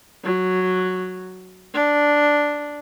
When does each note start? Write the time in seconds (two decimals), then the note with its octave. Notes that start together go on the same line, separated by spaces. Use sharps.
0.24 F#3
1.74 D4